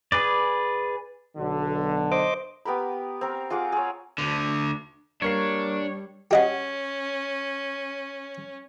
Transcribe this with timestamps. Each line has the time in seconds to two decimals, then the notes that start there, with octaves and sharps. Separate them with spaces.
0.12 G#4 B4 D5
1.37 B1 D3
2.12 C5 D#5 D6
2.65 B3 G4 A#4 B5
3.21 C4 A#4
3.50 F4 G#4 F#5 D6
3.72 G#4 C#5
4.18 D2 D3
5.22 G3 A#3 D4 A#4 C#5 C7
6.31 C#4 G4 D#5 F#5